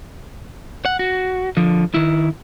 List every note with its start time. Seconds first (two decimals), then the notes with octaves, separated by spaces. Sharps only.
0.85 F#5
0.99 F#4
1.57 D3 F3
1.94 D#3 E4